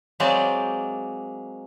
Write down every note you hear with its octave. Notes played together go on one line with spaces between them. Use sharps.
F#3 G#3 A#3 C4 D5